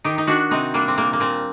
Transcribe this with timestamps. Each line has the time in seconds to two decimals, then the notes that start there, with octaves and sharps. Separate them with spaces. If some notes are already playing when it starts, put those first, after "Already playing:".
0.04 D#3 D#4 G4
0.18 D#4
0.27 D#3 D4 F#4
0.51 C3 C4 D#4
0.74 G3 A#3 D4
0.88 C4
0.97 A#2 A#3
1.13 A#3
1.20 A#2 C4